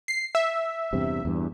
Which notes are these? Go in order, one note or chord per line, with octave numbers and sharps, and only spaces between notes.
C7
E5
E2 G2 C3
E2 G2